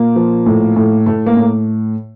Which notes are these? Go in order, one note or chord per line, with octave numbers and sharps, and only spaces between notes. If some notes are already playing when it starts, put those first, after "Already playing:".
Already playing: A#2 A#3
F3
A2
A2
A2 A3
A#3
A2